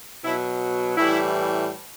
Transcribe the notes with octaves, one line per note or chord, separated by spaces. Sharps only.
B2 F#3 E4
A2 E3 G3 E4